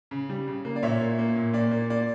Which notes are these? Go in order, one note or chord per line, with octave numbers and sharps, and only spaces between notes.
C#3
G3
C#3
A#3
D5
A#2 C#5 E5
A#3
A#3
A#2
A#2 D5
A#3
A#3 D5